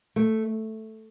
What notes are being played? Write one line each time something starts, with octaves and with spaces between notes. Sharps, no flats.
A3